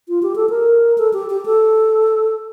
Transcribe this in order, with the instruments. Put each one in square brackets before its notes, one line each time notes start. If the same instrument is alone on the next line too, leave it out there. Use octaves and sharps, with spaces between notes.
[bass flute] F4
G4
A4
A#4
A4
G4
G4
A4